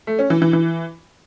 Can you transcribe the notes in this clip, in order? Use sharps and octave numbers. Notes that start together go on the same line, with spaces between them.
A3
C#4
E3
E3
E3